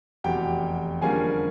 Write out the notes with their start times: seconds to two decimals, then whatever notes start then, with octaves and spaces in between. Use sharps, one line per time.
0.24 F1 E2 B2 G4 G5
1.02 F2 D3 G3 A#3 C#4 G#4 G#5